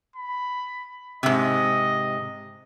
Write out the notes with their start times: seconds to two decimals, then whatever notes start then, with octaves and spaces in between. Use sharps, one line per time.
0.16 B5
1.23 G#2 C3 D#5